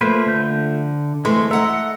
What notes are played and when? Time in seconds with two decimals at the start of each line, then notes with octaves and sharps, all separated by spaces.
0.01 F3 A3 A#3 B4 C5
0.26 D3 G6
1.25 F2 E3 G#3 A3 C6
1.51 A4 D#5 E5 F#5 A#5 E6